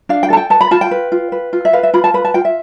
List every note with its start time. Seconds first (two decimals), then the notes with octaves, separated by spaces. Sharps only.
0.09 D4 F5
0.23 G5
0.30 A4 A5
0.37 G5
0.50 B4 A5
0.61 B5
0.71 F4 A5
0.81 G5
0.91 B4
1.12 F4
1.32 B4
1.53 F4
1.65 E5
1.73 B4 F5
1.83 E5
1.94 F4 B5
2.04 A5
2.14 B4 B5
2.25 A5
2.34 F4 G5
2.45 E5